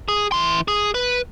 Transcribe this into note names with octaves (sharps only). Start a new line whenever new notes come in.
G#4
E3 C6
G#4
B4